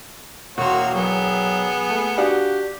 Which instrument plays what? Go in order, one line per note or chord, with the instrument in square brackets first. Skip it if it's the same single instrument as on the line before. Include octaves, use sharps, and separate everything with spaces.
[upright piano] E1 C6 [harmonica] A#3 F#4 C#5
[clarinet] F#3 [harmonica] B3 G#4
[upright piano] A3
[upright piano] D4 F#4 F5 [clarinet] G4